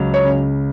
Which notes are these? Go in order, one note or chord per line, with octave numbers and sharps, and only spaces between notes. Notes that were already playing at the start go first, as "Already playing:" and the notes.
Already playing: C#2 F#3
C#5
C#3